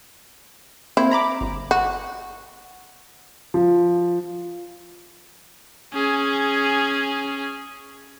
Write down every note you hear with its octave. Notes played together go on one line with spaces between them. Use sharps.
A#3 C4 E4 C5
A#5 B5 D6
G1
F#4
F3
C#4 G#4